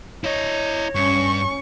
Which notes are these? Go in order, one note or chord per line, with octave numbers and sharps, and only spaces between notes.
E4 C#5 D#5
G2 C#4 C#6